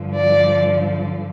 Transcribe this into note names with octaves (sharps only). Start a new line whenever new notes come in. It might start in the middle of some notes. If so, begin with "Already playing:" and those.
Already playing: G2 D3 F3
D5